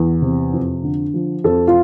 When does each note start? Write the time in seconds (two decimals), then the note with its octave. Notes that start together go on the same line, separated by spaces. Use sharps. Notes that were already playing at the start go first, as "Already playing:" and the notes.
Already playing: E2
0.22 C3
0.53 F2
0.83 D3
1.14 F3
1.44 F2 A4
1.68 F4